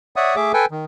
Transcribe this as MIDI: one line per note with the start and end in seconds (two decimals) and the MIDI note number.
0.16 0.35 73
0.16 0.35 74
0.16 0.35 76
0.16 0.35 78
0.16 0.35 87
0.36 0.52 57
0.36 0.52 68
0.36 0.52 76
0.36 0.52 86
0.54 0.66 69
0.54 0.66 71
0.54 0.66 79
0.54 0.66 80
0.71 0.85 51